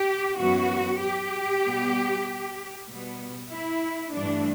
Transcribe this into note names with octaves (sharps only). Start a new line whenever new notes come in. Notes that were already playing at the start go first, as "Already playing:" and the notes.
Already playing: G4
F#2 E3 B3 F#4
G4
B2 G3 B3
B2 G3 B3
E4
G2 E3 A3 D4